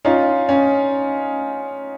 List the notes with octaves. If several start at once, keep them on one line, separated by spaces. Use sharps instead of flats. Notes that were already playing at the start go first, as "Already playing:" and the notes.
C#4 D#4 F4
C#4